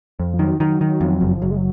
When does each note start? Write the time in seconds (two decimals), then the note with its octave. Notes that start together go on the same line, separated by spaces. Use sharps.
0.20 F2
0.34 F3
0.39 D#3 F#3
0.60 D#3 F#3
0.81 D#3
1.01 F2
1.21 F#1
1.35 F3
1.42 F#1 F#3
1.51 G#3
1.57 F#3